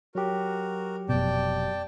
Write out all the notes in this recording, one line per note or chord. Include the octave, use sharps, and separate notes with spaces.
F#3 F#4 G4 A#4
F1 B2 D5 G5 A5